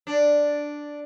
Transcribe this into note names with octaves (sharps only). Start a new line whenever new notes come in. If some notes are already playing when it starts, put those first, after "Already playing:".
D4